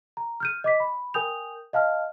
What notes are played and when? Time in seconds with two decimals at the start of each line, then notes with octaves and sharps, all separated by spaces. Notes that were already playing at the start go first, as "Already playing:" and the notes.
0.17 A#5
0.40 F6 G6 D#7
0.64 D#5 D6 B6
0.80 B5
1.14 A#4 G5 G#5 D#6 G6 F7
1.73 D#5 F5 A5 F6